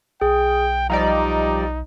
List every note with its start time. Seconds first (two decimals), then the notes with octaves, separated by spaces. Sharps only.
0.21 B1 G#4 G5
0.90 F3 G3 D#4 D5 D#5 A#5